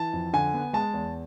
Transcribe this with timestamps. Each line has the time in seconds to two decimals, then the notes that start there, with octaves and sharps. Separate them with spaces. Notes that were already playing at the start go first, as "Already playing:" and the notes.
Already playing: E3 A5
0.13 F2
0.33 D3 G#5
0.54 B3
0.73 G#3 A5
0.94 E2